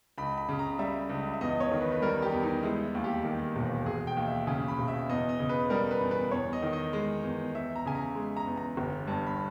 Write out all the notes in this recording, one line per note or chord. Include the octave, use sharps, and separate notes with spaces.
C#2 B5
B5
C#3
A#5
G3 E5
C#2
E5
E2 D#5
C#5
D#3
B4
B4
G3 A#4
G4
E2
D#4
G#3 E4
E4
D#2
G4
D#3
E1
E1 G#4
G5
D#2
E5
C#3 G#5
B5
E1
E5
E2 D#5
D#5
C#3
B4
G3 A#4
B4
E2
B4
E2 C#5
D#5
D#3
D#5
G#3
E2
E2 E5
A#5
C#3 G#5
A#5
G#3
A#5
E2
A#5
G1
G2
B5